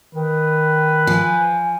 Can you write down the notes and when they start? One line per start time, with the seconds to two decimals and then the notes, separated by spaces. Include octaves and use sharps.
0.15 D#3 B4
1.07 F3 G#5